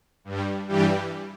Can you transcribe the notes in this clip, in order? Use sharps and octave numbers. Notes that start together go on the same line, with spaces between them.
G2
G3
G2 E3 G3 G4